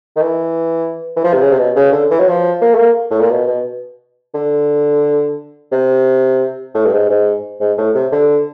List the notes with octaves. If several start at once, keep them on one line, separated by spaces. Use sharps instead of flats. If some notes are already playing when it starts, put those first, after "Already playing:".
D#3
E3
E3
F3
C3
C#3
C3
B2
C#3
D3
E3
F#3
F3
A#3
A3
A#3
A2
A#2
B2
B2
D3
C3
A2
G2
G#2
G#2
G#2
A2
C3
D3